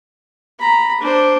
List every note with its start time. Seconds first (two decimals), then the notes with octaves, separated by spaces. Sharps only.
0.59 A#5 B5
1.00 D4 C5